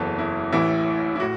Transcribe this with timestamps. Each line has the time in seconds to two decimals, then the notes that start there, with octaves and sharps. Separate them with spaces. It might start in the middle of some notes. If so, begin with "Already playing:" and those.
Already playing: F#1 E2 E3 A4
0.19 E4
0.52 A1 A2 E3 E4
1.16 E4
1.20 A2 F#4